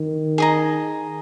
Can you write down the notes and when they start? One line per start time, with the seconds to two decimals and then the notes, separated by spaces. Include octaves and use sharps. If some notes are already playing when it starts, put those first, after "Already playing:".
Already playing: D#3
0.38 G#4 D#5 A#5